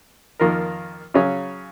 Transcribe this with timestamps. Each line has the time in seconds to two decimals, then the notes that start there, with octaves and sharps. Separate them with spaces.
0.39 F2 D#3 A#3 F4 A#4
1.14 C#3 F#3 C#4 G#4